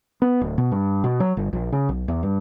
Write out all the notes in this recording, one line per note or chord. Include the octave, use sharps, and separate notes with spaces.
B3
D1
B2
G2
B2
F#3
G1
A#1
C#3
B1
E2
G2